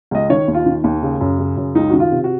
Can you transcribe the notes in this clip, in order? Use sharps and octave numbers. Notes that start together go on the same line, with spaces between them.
C#2 D#5
D#3 C#5
D#2
F4
D#3
D#2
C#3
F#2
C#3
F#2
C#2 D#4
D#3 F#4
F4
C3
F#4